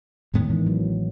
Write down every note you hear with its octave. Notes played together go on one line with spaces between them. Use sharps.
A1 A2 D#3 G#3 B3
D#3
E3
F#3